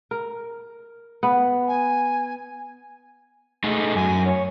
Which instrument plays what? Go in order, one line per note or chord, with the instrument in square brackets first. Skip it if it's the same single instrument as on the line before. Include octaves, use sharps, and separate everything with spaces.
[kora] A#4
B3
[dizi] G#5
[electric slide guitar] A3 D#4 G#4
[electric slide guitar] F#2 [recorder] G#5
[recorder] C#5